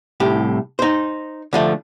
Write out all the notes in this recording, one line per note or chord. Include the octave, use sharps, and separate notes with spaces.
C2 A2 G4
D#4 C5
D3 F3 A3